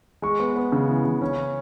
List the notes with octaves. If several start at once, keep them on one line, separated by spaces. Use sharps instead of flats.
G#3 C#6
B3
B3
C#3
E3
C#3
C#4